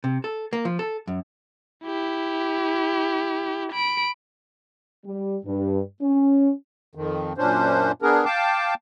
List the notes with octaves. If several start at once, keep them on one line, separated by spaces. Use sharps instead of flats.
C3
A4
A#3
F3
A4
F#2
E4 G4
B5 D7
G3
G2
C#4
F2 D#3
F#2 A#2 C#4 D4 C5
B3 D4 G#4 A#4
F5 G5 A5 D6